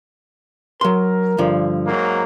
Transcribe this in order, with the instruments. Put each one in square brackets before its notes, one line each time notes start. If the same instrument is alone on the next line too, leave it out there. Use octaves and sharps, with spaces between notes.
[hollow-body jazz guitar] F#3 C6 [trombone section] A#4
[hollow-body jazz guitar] G2 D3 F3
[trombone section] G#2 F#3 A#3